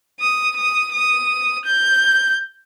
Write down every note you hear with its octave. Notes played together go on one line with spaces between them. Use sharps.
D#6
D#6
D#6
G6